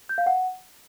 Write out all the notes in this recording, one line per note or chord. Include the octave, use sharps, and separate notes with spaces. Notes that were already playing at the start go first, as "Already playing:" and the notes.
G6
F5
F#5